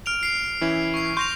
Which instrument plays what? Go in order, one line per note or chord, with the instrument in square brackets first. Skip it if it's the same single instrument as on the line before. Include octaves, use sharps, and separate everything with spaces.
[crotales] F6 D7 F7
C7 D7
[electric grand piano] E3 C#4 E4
[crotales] C#6 C7
[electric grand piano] C6 C#6 [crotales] G6 A#6 F7